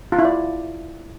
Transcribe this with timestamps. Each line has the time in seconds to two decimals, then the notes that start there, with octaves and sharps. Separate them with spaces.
0.12 F4
0.19 E4
0.25 D5